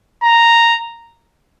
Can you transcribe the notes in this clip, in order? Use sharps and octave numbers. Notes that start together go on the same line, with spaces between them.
A#5